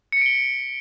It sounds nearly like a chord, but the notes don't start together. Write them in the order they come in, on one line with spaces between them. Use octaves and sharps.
C#7 B6 D7 G7